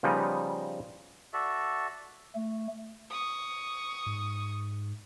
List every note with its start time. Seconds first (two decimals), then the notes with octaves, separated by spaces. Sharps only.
0.03 C#3 F3 G3 B3 D#4
1.33 F#4 A4 D5 E5
2.35 A3
3.10 C#6 D#6
4.06 G#2